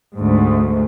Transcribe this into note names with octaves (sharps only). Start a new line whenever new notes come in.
D2 G#2